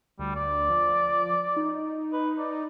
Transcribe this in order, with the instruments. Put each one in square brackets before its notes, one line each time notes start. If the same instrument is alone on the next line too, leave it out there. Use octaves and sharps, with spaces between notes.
[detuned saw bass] D2 [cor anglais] G3
[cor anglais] D5
[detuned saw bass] F3
D#4
[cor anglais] B4
D5